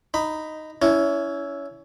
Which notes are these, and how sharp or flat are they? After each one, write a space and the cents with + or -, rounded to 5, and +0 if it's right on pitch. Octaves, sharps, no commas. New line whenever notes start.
D#4 +0 B5 +15
C#4 +25 E4 +0